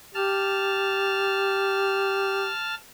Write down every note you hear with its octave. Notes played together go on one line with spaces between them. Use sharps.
G4 A5 F6